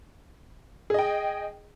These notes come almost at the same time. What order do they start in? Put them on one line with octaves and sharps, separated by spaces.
G#4 D#5 G5